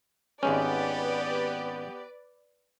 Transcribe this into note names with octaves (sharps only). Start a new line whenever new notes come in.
G#1 G#3 B3 C#4 G4 B4 D5